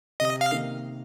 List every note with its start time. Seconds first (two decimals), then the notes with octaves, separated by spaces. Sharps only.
0.20 C3 D#5
0.41 F5
0.52 D#3 A#3